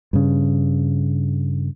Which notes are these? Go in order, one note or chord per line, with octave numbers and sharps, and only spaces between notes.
G2 C#3